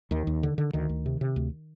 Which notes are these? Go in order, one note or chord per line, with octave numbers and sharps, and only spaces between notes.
D#2 D#3
D#2
D3
D3
D2 D#3
D2
C3
C3
D2